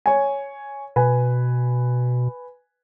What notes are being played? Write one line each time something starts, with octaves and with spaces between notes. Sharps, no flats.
C#5 G#5
B2 B4 G#5